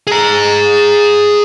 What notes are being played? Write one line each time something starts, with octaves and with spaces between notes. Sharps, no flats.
G#4 A#5